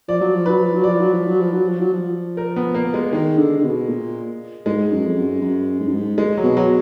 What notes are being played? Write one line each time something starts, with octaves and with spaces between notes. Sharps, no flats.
F3 D5
F#3
F3
F#3 B4
F3
F#3
F3 D5
F#3
F3
F#3
F3
F#3
F3
F#3
F3
A#4
B3
A#3
G#3
D#3 G#3
D3
D3
B2
A#2
G#2 G#3
F#2
F2
F#2
F#2
G#2
F#2
G#2
G#3
F#3
B2
F#3